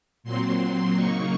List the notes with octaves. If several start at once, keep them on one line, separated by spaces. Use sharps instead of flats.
A#2 F#3 C4 C6
C#3 F#3 A#3 D#4 C#6